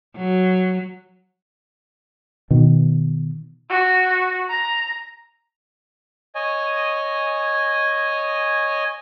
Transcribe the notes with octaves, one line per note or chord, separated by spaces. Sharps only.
F#3
B2 D#3
F#4
A#5
C#5 D#5 G#5